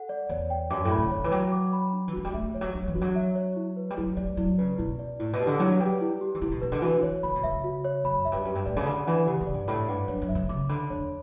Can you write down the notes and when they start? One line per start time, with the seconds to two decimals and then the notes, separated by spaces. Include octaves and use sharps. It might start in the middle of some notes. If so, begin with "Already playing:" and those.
Already playing: A4 F#5
0.09 D5
0.29 E2 C#5
0.50 G5
0.70 F#2 D6
0.85 A2
0.91 B5
0.98 C#3
1.11 D3 C#5
1.24 E3
1.31 F#3 G5
1.52 D6
1.73 B5
1.93 D4
2.08 E3
2.13 F#3 F#4
2.25 G3
2.34 A3 E5
2.54 E3 C#5
2.61 F#3
2.75 F#3 D4
2.88 E3
2.95 F#4
3.01 F#3
3.15 E5
3.35 C#5
3.56 E4
3.77 B4
3.90 G3
3.97 F#3 E4
4.17 G3 D5
4.37 F#3 E4
4.58 C#3 B4
4.78 B2 E4
4.99 D5
5.19 A2 E4
5.33 B2
5.40 G4
5.47 D3
5.60 F#3 E4
5.80 G3 B4
6.01 E4
6.21 G4
6.35 E3
6.41 D3 E4
6.51 B2
6.62 B2 B4
6.72 D3
6.82 E3 F#4
7.02 E3 C#5
7.23 D3 B5
7.36 B2
7.43 C#3 E5
7.64 F#4
7.84 C#5
8.04 F#2 B5
8.25 F#2 E5
8.32 G2
8.45 F#2 G4
8.55 G2
8.66 A2 D5
8.76 C#3
8.86 D3 B5
9.07 E3 F#5
9.27 C#3 G4
9.41 C#3
9.47 D5
9.54 G2
9.68 A2 B5
9.88 G2 F#5
10.08 F#2 C#5
10.22 F#2
10.29 E5
10.35 C#3
10.49 C#3 D6
10.69 D3 B5
10.90 E2 C#5